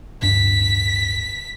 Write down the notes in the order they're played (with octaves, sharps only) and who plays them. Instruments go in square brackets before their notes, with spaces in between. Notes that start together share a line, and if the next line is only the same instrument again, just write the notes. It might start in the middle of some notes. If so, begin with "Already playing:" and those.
[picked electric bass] D1 G2 D4 [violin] B6